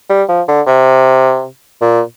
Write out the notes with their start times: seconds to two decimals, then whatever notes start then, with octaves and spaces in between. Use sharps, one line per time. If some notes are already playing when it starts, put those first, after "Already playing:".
0.09 G3
0.29 F3
0.48 D3
0.66 C3
1.81 A#2